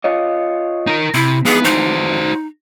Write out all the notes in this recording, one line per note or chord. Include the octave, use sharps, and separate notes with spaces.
F4 C#5 D#5
D#4 A#4
C3 E4
F2 G#2 E3 B3 G#4
D#4 F#4 C5